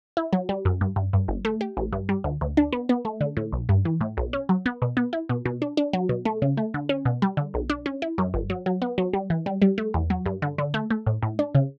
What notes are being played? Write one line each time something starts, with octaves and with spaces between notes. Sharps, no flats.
E4
F#3
G3
F#2
G2
G2
G2
G1
A3
G4
A1
G2
G3
D2
D2
D4
B3
B3
A3
D3
A2
B1
G2
E3
A2
B1
C#4
F#3
B3
B2
B3
E4
B2
B2
D4
D4
F#3
B2
A3
C#3
A3
D3
C#4
B2
G3
D3
B1
D4
C#4
E4
F#2
G1
F#3
F#3
B3
F#3
G3
E3
G3
G3
A3
E2
F#3
G2
D3
D3
A3
A3
A2
A2
D4
C#3